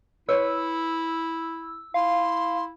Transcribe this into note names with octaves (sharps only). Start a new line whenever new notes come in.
E4 B4 C#5 E6
E4 F5 C6